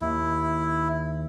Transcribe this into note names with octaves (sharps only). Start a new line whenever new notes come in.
D#2 E4